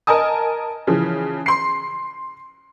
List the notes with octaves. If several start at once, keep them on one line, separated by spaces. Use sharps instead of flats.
A#4 D#5 G#5 A5 D#6
C#3 E3 F3
C6 C7